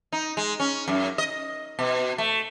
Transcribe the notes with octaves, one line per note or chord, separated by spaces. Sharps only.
D#4
G#3
C#4
F#2
D#5
B2
A3